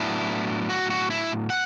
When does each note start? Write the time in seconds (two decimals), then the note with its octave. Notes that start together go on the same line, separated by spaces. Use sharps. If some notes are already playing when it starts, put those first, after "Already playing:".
Already playing: A2 F#3 B3 D4 E4
0.69 F#4
0.90 F#4
1.10 E4
1.50 F#5